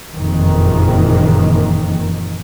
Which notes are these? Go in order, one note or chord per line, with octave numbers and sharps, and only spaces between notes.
F#1 F2 A#2 D#3 E3